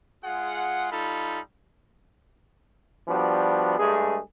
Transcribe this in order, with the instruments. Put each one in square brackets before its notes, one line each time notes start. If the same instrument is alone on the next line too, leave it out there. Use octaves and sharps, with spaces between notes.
[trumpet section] G#3 F4 G#4 F#5
G3 D#4 F4 A4 B5
[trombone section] F3 G3 B3 D4 F#4
G2 G#3 A3 G#4